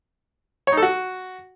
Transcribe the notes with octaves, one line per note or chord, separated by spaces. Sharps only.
C#5
D#4
A4
F#4